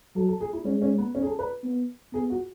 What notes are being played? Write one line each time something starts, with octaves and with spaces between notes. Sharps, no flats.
F#3 A4
A4
G#4
E4
G#3 C#4
C#4
B3
C#4
G#4
A4
B4
B3
B3 G#4
F#4